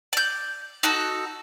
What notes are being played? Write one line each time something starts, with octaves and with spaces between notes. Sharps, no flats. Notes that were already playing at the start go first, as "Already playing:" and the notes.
D5 G6
D#4 F#4 A4